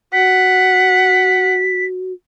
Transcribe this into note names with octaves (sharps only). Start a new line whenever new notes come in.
F#4 F#5 B6